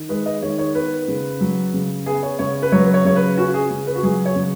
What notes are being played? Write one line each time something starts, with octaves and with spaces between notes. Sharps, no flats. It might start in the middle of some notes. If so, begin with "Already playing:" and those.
Already playing: D#3
G#3 B4
D#5
D#3 C#5
C#5
B3 B4
C#3
F#3
C#3
B3 G#4
C#5
C#3 C#5
B4
F#3 C#5
B4
C#5
C#3 C#5
B4
C#4 F#4
G#4
C#3
B4
F#4
F#3 G#4
C#5
C#3